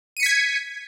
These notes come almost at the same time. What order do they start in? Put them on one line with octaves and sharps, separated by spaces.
D#7 C#7 B6 G#6